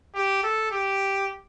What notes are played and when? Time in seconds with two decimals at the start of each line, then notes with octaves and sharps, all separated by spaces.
0.14 G4
0.43 A4
0.71 G4